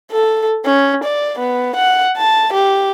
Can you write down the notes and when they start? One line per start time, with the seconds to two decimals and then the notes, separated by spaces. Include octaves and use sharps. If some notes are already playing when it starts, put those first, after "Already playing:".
0.11 A4
0.65 C#4
1.04 D5
1.39 B3
1.76 F#5
2.17 A5
2.54 G4